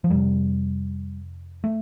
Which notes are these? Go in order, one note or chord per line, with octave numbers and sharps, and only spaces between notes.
F3
F2 C3 G3
A3